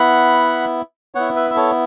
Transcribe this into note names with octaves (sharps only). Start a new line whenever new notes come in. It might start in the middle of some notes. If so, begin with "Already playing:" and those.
Already playing: B3 E4 F#5 B5
B3 E4 C#5 F#5
B4 E5
E5
A4 C#5